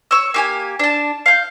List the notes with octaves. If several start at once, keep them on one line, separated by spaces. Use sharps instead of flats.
C#5 E6
A#3 G4 G#5
D4 A5
F5 G6